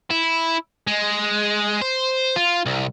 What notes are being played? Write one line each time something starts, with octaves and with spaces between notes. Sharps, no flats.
E4
G#3
C5
F4
C2